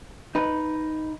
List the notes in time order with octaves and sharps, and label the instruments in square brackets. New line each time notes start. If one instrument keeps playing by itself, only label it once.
[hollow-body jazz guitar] D#4 B4